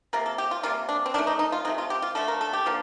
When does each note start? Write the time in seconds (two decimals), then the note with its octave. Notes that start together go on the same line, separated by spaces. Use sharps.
0.13 C3 F3 A#3 A#4
0.26 A4
0.38 G4
0.51 F4
0.63 C3 G3 A#3 F4
0.89 D4
1.06 C4
1.14 D#3 D4
1.18 A3
1.27 D#4
1.39 D#4
1.52 F4
1.65 C3 D#3 A3 D#4
1.78 F4
1.90 G4
2.02 F4
2.15 D3 F3 A3 A4
2.28 A#4
2.41 A4
2.53 G4
2.66 D3 F3 A#3